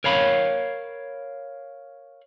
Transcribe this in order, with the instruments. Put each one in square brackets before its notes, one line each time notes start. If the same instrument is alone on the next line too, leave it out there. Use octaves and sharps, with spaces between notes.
[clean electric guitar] A#4 C#5 F5 B5